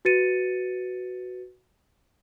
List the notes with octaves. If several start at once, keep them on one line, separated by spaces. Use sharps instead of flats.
F#4 B4 A6 C#7 D#7